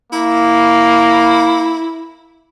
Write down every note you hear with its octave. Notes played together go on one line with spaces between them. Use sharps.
A#3 E4